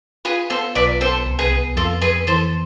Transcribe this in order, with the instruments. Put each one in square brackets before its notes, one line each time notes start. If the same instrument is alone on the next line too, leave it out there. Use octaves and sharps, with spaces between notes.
[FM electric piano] F4 [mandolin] G#4 B4
[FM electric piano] B3 [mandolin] A4 C5
[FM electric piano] B1 [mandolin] B4 D5
[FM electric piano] B3 [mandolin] A4 C5
[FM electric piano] C2
[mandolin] G#4 B4
[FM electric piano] B3
[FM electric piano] F2 [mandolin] F4 A4
[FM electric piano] F2 [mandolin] G#4 B4
[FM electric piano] E3 [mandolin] A4 C5